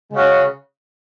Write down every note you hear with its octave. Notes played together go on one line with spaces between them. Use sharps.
C#3 G#3 C#4 F#4